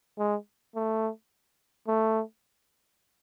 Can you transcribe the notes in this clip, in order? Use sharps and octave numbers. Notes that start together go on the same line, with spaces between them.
G#3
A3
A3